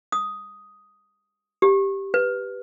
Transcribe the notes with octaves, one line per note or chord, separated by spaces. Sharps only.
D#6
G4
B4